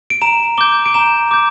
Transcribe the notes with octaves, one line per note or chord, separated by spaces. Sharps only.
D7
A#5 E7
D6 G6 G7
D7
A#5 E7
D6 G6